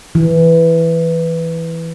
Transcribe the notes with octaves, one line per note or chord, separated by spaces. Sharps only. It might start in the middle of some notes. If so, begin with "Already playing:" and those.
E3